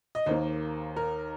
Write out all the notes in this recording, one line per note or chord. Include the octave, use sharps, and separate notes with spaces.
D#5
D#2 D#3 A#3 C5
A#4